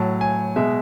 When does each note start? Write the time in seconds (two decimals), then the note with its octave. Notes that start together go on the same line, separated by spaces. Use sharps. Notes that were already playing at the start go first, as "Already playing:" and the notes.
Already playing: A2 F#3 A5
0.21 G#5
0.56 B2 G#3 E5